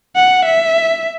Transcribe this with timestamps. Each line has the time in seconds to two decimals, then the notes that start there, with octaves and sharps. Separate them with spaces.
0.16 F#5
0.46 E5